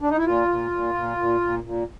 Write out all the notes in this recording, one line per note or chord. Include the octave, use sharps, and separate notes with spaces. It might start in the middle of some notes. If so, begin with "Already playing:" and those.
D4
D#4
E4
A#2 F4
A#2
A#2
A#2
A#2
A#2
A#2